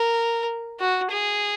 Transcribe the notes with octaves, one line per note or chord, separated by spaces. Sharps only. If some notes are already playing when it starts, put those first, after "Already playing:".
Already playing: A#4
F#4
G#4